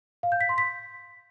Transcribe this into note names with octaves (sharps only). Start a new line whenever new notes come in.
F5
G6
B6
C6
B6